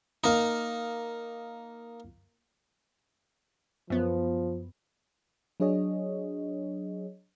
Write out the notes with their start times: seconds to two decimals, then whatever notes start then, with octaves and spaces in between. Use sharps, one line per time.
0.24 A#3 D#4
3.90 F#2 F3 B3
5.60 F#3 D4 G#4 C#5 D#5